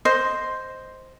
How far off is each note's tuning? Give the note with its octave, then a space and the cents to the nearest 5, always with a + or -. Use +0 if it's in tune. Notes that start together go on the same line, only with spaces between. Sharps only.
C5 +0 D#5 +0